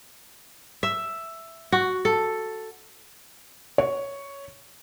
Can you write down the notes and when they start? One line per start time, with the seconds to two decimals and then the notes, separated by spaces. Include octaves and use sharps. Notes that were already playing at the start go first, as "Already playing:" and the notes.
0.83 E5
1.72 F#4
2.05 A4
3.78 C#5